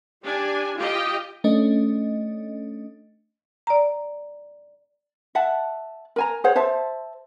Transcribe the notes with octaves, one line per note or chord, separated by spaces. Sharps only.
D4 G4 G#5
F4 G4 D#5 G5
A3 C#4 D4 D#5
D5 A#5
E5 F#5 A5
A#4 G#5 A#5
G#4 C5 C#5 F#5
C5 E5 A5